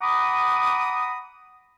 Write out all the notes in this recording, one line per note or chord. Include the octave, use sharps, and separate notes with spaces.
F#5 A#5 B5 D6 D#6